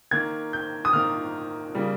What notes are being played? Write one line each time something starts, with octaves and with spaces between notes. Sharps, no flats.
D#3 A#3 G#6
G6
D#6
D#3 A#3 F6
C#3 G3 A#3